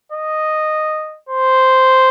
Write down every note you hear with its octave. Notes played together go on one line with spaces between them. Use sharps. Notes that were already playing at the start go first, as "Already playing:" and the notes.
D#5
C5